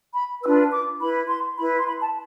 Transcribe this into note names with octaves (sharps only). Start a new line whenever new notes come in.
B5
D4 F4 B4 E6
D6
E4 B4 B5
C6
E4 B4 B5
C6
B5
A5